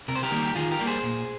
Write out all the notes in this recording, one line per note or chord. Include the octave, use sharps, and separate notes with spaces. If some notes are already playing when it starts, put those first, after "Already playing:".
C3 A#4
C5
G4 A#4
D#3 G3 A#3
G4
D#3 F4 G#4
G4 A#4
G3 A#3
G#4 C5
A#2